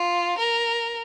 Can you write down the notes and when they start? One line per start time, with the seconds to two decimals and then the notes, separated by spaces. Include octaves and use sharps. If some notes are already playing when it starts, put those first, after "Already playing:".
Already playing: F4
0.38 A#4